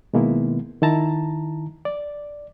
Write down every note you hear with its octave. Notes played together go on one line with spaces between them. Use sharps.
B2 D#3 G#3 A#3 B3 E4
D#3 E4 A5 A#5
D5